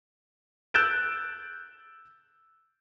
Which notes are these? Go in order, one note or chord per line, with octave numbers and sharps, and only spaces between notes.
E6 F#6 G6 A6 D7 E7